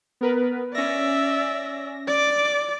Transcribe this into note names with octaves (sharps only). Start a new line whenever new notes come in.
B3 A#4 B4
C#4 D5 E5 A#6
D5 D6